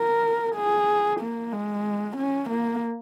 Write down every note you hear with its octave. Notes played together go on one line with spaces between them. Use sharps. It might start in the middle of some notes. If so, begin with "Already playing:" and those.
Already playing: A#4
G#4
A#3
G#3
C#4
A#3